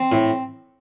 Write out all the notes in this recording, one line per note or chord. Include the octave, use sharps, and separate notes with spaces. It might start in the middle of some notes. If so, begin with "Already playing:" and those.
Already playing: C4
A2